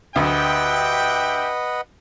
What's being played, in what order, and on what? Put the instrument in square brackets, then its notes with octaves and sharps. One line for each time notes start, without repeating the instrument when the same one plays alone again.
[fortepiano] D2 [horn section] G4 E5 G5 [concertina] B4 D#5 F#5